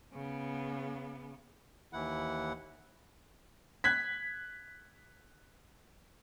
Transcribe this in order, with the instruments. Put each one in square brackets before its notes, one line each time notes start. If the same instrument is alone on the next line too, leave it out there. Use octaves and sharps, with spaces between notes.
[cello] C#3 B3
[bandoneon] D#2 E3 E4 F#5
[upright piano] F#6 G#6 B6